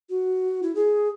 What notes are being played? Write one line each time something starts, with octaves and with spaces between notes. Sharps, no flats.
F#4
E4
G#4